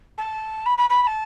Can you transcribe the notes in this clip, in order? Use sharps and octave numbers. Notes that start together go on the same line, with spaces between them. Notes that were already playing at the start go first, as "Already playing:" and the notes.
A5
B5
B5
B5
B5
A5